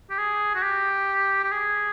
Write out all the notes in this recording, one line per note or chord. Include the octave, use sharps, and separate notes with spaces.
G4
G#4
F#4
G4
G4
G#4